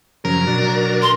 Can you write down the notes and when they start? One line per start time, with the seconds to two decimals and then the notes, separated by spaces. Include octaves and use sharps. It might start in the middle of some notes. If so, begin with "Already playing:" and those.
0.25 F#2 C#3 F3 A#4
0.47 B2 F#3 D4
1.02 C6